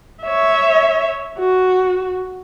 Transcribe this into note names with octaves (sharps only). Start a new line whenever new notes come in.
C#5 E5
F#4